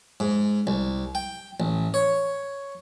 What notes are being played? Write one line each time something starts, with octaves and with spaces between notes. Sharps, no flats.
G#2
C2
G5
A1
C#5